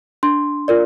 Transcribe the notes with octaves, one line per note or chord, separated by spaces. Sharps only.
D4 C6
F4 A#4 D5